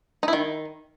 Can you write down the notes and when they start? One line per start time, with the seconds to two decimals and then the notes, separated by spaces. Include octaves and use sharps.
0.23 D#4
0.28 E4
0.33 D#3